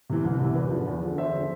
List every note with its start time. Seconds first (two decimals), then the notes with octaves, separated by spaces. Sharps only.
0.10 C3 E3
0.25 C2
0.40 C3 E3
0.55 E2 B4
0.70 D3 F3
0.86 E2
1.02 D3 F3
1.18 E2 C5 E5
1.33 D3 F3